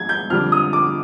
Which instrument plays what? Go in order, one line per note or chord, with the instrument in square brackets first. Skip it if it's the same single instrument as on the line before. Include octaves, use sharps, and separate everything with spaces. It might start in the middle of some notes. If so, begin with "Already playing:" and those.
Already playing: [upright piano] G#6
G6
F2 D3 G3 D4 F6
D#6
D6